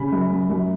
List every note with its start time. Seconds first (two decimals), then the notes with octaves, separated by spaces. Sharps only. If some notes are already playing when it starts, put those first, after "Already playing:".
Already playing: C#3 B5
0.12 F#2
0.31 F#2
0.50 F#2